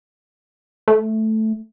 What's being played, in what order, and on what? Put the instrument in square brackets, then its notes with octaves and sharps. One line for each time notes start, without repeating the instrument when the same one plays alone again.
[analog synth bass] A3